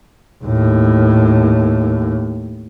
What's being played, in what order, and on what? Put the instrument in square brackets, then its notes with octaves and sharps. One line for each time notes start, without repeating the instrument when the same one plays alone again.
[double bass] D#2 A2